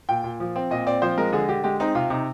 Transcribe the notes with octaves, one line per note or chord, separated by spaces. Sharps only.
A#2 G5
A#2
F3
C4
A#2 D#5
C4 D5
F3 C5
G#3 A#4
D3 G#4
D3 G4
G#3 G4
C4 D#4
C3 F4
C3 D#4